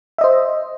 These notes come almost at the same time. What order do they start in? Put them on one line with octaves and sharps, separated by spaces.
E5 D#5 C5